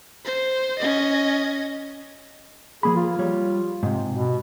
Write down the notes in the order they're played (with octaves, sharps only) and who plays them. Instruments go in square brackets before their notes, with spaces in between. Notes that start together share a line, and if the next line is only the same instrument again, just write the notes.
[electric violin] C5
C#4 D#5
[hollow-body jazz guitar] F3 A#3 B5 [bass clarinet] G#4
[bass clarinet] F4
[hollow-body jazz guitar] G3 C#5
G#2 C3
[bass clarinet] B2